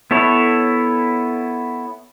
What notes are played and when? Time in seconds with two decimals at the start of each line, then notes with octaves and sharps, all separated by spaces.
0.11 B3 E4 A4 C#5